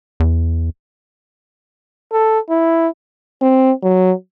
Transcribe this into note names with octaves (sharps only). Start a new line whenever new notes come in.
E2
A4
E4
C4
F#3